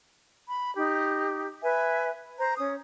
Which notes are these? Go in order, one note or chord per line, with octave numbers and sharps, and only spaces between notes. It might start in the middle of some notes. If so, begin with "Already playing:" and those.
B5
D#4 G4
B4 E5 G#5
C5 A#5
C#4 D#6